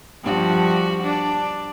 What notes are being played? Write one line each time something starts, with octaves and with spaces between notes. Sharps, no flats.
G2 F3 F#4
D4